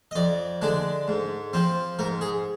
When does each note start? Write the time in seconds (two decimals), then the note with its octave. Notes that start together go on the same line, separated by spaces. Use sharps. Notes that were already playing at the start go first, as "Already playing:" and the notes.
0.11 D#5
0.15 F2 D5
0.62 D3 G#3 D4
1.08 G#2
1.53 F3 C4
1.99 G#2 A#4
2.21 G#4